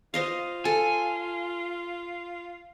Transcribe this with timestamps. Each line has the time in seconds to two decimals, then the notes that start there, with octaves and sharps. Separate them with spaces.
0.14 F4 C5 D#5 F5
0.65 A4 G#5